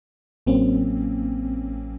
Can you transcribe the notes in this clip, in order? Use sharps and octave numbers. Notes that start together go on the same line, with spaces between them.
A1 F#3 A#3 C4 C#4